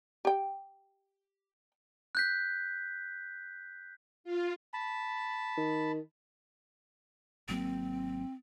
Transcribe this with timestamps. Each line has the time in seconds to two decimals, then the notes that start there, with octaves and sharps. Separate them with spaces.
0.25 G4 G5
2.15 F#6 G6 B6
4.24 F4
4.74 A5 B5
5.57 D#3
7.48 G#1 F#3 A#3 C4